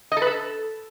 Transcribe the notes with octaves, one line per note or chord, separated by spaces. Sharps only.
D#5
A4
B4
A4